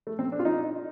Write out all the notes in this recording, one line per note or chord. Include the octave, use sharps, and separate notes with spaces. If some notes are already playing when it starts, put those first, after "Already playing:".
A3
C4
D4
F4
D#4